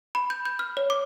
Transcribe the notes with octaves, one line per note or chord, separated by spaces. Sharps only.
B5
G6
G6
F6
C#5
D6